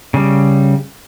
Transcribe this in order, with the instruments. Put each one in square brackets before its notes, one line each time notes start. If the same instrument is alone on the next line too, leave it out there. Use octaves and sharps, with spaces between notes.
[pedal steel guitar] C#3 G3